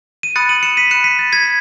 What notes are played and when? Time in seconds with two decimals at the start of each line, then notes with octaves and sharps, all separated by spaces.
0.23 D#7
0.36 B5 D#6 F#6 A6 C#7
0.49 D#7 F#7
0.63 C#7 E7
0.77 B6 D#7
0.90 B5 F#6 C#7 E7
1.04 B6 D#7
1.19 A6
1.32 G#6 B6